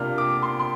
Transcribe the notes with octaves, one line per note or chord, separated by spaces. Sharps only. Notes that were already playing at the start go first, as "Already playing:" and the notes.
Already playing: C3 A#3 D4 F4 F6
D6
C6
C6